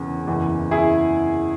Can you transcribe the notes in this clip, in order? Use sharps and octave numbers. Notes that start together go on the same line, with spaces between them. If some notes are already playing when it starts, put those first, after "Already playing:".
Already playing: E1 E2 C#3 E3
F#1 E2 E3
E4 G#4